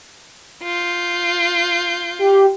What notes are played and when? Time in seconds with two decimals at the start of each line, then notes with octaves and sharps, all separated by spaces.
0.63 F4 G6
2.19 G4